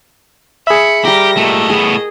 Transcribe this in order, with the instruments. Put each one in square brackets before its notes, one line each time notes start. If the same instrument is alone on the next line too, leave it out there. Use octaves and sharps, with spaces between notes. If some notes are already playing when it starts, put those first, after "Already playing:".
[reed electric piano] G#4 E5 [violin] B5 C#7
[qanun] G3 A#4 [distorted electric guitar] G4 [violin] A#6
[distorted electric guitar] A#2 A3 [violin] D#5
[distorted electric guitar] A2 B3 [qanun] G#4